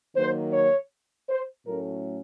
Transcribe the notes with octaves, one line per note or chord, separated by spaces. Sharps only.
D#3 F#3 A#3 C5
C#5
C5
A2 F#3 A3 C#4 A#4